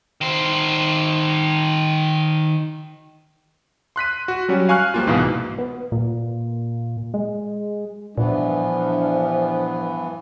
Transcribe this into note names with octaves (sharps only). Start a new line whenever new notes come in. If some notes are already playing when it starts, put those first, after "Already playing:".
D#3 C5
C6 F#6 B6 D#7
F#4
F#3 G3 C#4 F#4
F5 G#5 C#6 F6 F#6
F3 G3 A#3 F4
C2 G#2 B2 E3 F5
B3
A#2
G#3
G2 A#2 E3 F3 B3 D4